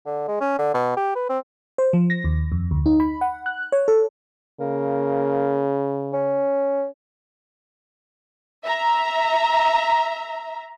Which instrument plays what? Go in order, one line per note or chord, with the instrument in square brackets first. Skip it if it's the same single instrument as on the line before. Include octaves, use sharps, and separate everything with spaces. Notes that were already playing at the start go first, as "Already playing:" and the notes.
[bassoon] D3
G#3
C#4
D3
B2
G4
B4
C4
[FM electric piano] C5
F3
A#6
D#2
F2
D2
D#4
B5
F#5
F#6
C#5
A4
[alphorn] C#3 [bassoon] A#3
[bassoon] C#4
[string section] E5 A#5